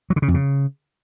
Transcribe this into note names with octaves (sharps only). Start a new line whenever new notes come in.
F#3
D3
C#3
F2
C#3